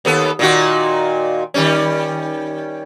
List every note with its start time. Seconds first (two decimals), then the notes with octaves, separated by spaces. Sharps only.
0.05 D#2 B3 A4
0.39 A#2 D#3 F#4
1.54 D#3 G3 C#4